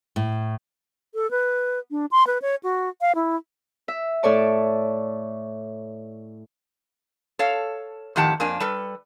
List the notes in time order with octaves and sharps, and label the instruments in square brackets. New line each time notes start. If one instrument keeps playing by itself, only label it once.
[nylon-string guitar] A2
[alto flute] A4
B4
D4
C6
B4
C#5
F#4
F5
E4
[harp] E5
A2 A4 C#5 D5 A5
[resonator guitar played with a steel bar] A4 C#5 F5
F2 A2 D#3 G4 F#5 A5
F2 A#3 D4 G#5
G3 A4 B4